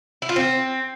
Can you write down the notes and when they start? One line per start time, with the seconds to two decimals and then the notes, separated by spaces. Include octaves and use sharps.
0.22 E4
0.29 F4
0.36 C4